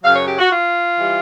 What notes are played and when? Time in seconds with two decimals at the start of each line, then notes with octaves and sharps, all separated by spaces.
0.03 F#2 C#3 F#3 F5
0.14 C#5
0.26 G4
0.39 F#4
0.50 F4
0.98 E3 G3